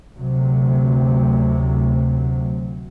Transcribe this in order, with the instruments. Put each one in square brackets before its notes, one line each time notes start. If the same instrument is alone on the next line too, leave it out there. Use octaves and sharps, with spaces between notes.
[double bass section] D2 C3 F#3